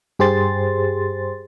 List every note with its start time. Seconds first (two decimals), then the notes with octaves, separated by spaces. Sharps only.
0.19 G2 G4 G#4 C5 C6 A6